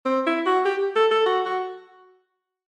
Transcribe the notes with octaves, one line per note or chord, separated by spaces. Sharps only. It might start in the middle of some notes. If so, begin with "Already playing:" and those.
C4
E4
F#4
G4
A4
A4
F#4
F#4